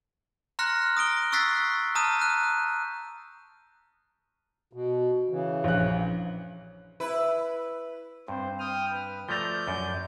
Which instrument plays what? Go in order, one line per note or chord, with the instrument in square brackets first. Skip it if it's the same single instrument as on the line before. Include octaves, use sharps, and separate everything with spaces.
[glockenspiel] A#5 C6 F6 F#6 A#6 C#7
D#6 A#6 D7 G7
C#6 E6 F#6 A6 B6 C7
A5 A#5 D#6 F6 G6 D#7
F#6
[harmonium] B2
C#3 E3
[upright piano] A#1 F#6
[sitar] E4 B4
[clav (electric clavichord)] G2 [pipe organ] C4 C5
[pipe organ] G5 D#6 F6
B4
[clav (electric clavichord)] F3 A3 A#5 [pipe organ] D5 G6
[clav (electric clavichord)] F#2